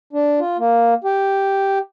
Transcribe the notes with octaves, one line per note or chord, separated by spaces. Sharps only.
D4
F4
A#3
G4